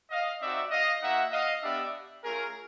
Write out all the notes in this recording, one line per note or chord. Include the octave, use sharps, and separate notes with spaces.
D#5 F5
C4 D#4 F#4 D5 E5
D#5 F5
A#3 D#4 F#4 E5 F#5
D#5 F5
B3 D4 G4 D5 E5
A3 C#4 F4 G#4 A#4